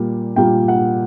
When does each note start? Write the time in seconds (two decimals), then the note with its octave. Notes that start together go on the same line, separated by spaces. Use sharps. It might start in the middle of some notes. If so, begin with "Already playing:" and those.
Already playing: A#2 G3 A#3
0.36 A#2 G3 A#3 G5
0.68 F#5